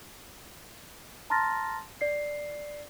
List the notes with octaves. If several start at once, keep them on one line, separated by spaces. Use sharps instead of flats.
A5 A#5 C6 F6 A6 A#6
D5 C7